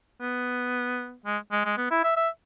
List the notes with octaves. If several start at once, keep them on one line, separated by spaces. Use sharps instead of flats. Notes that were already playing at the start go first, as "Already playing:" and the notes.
B3
G#3
G#3
G#3
B3
E4
E5
E5